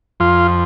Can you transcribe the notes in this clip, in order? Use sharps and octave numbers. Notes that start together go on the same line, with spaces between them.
F2 F4